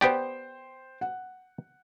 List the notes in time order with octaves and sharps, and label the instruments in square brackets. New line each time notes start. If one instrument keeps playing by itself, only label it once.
[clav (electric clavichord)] B3 G4 D5 [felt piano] C5 G5
[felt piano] F#5